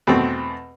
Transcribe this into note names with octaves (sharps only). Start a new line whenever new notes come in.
E2 B2 A3 C4